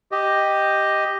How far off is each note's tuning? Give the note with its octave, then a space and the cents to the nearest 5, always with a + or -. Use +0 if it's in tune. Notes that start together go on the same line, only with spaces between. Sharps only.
G4 +0 D#5 +0